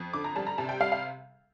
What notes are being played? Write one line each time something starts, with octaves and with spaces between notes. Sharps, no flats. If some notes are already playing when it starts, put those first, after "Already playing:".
Already playing: F2
D3 D6
A#5
G3 A5
A#5
C3 A5
G5
G3 F5
F5